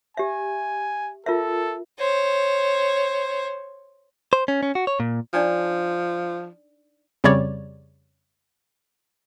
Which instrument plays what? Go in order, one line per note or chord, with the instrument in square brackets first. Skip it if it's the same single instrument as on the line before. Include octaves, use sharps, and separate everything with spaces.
[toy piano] G4 E5 [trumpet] G#5
[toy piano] F4 A#4 E5 [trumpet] A4
[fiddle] C5 C#5
[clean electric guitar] C5
C#4
C#4
F#4
C#5
A#2
[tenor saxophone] F3 [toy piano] D4 D#4 D5
[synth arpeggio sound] F2 C#3 G3 C#5 D5